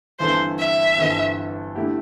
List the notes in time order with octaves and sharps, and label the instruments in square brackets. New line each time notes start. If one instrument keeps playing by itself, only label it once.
[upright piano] G1 G2 E3 C4 A4 [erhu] C5
[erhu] E5
[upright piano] G1 G2 E3 C4 A4
D3 A3 E4 G4